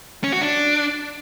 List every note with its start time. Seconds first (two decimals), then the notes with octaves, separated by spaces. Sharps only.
0.24 C#4
0.32 F#4
0.41 D4